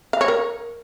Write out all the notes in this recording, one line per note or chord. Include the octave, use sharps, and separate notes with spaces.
F5
C#5
A#4